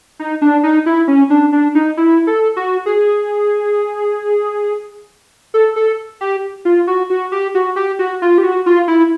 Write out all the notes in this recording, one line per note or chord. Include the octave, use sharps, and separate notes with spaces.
D#4
D4
D#4
E4
C#4
D4
D4
D#4
E4
A4
F#4
G#4
A4
A4
G4
F4
F#4
F#4
G4
F#4
G4
F#4
F4
G4
F#4
F4
E4